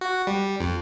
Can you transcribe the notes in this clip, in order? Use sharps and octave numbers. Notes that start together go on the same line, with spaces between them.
F#4
G3
F2